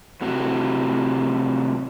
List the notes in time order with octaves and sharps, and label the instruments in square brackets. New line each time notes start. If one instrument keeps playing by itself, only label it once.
[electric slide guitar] A2 C3 F#3 F#4